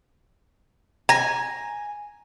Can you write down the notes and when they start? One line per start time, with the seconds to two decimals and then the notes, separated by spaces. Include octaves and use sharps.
1.09 G#5 A#5 A#6